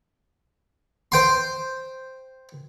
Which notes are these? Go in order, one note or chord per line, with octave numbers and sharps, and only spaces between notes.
C5 G5 C6